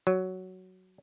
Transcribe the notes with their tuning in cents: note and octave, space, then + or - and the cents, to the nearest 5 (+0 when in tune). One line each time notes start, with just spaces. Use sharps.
F#3 +5